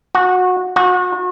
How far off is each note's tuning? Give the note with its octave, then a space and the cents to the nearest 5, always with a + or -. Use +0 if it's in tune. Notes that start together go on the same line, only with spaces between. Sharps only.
F#4 -20
F#4 -35